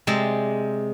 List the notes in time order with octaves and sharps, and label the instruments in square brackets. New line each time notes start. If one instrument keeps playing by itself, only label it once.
[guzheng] C3 G#3 C4 D5